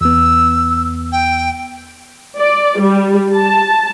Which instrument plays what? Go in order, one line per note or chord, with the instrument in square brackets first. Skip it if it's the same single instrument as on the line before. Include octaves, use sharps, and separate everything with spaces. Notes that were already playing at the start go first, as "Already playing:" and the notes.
[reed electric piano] E2 B3 [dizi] E6
[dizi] G5
[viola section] D5
G3
A5